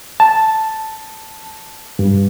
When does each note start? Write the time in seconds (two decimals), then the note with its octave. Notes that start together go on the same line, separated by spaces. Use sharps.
0.20 A5
1.99 G2